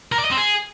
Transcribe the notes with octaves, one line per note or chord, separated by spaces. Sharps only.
A#4
D5
D#5
C4
G#4